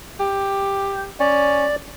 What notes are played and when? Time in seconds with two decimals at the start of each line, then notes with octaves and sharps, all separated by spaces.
0.20 G4
1.20 C#4 D5